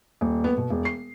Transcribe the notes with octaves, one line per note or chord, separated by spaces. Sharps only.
D#1
B3
B2
E1
C7